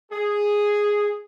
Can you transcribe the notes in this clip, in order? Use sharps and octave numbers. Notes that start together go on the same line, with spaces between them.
G#4